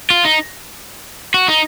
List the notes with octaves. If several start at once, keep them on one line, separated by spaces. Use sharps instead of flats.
F4
D#4
F#4
D#4